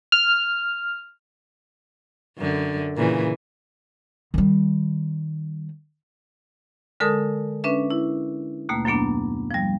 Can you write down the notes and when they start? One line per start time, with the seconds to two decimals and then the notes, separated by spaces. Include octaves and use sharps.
0.12 F6
2.38 F#2 D3
2.96 A#2 C#3 E3
4.34 D#3 G3
7.00 D3 G#3 A4 A#4 A5 D#6
7.64 C#4 D4 B4 E5
7.90 E4
8.69 D#2 B2 A3 A#3
8.85 F#2 F#3 A#3 B3 D4
9.51 F3 G3